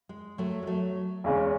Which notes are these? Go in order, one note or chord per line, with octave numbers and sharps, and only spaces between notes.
G#3
F#3 A3
G#3
F#3 A3
E2 C#3 G#3 C#4